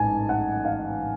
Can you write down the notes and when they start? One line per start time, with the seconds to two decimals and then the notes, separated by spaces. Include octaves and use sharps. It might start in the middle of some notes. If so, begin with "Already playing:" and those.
Already playing: A1 G#2 G#5 A5
0.29 F#5
0.65 F5